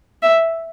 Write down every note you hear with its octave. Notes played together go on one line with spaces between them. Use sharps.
E5